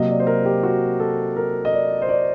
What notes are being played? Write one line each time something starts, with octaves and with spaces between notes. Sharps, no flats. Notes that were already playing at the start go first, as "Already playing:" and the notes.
Already playing: C3 F#3 A#3 D#5
D5
C5
A#4
G4
F#4
A4
A#4
D#5
D5
C5
D5